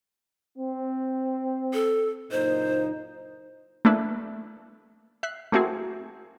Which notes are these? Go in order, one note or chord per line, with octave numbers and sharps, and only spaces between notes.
C4
A4
F#1 A#2 D#4 C5
A3 A#3 D4 E4 B4
E5 F#6 C7
A3 A#3 C4 E4 F#4 G#4